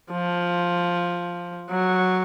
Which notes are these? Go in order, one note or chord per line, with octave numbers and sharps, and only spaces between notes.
F3
F#3